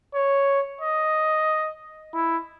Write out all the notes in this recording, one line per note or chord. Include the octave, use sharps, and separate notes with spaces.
C#5
D#5
E4